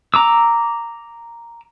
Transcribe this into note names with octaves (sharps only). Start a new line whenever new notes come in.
A#5 D6 E6